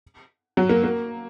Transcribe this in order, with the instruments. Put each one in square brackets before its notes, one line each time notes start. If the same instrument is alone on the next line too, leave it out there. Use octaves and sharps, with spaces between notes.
[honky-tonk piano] F#3
A#3
A#3